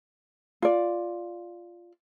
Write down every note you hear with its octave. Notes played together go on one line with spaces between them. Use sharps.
F4 D5